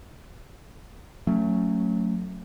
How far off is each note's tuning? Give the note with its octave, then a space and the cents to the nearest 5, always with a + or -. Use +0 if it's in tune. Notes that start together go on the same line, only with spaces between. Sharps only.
F#3 -15 A3 +15 C#4 -5